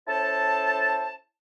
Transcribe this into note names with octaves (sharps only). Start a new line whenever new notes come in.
C#4 E4 A4 C5 A5